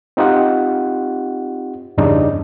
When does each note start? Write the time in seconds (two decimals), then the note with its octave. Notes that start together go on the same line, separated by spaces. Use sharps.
0.17 C4 D#4 F4 G4 F#5
1.98 E2 G2 C#3 D4 D#4